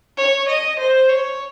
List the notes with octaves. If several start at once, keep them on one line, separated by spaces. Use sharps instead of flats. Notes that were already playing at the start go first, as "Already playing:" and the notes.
C#5
D#5
C5
C#5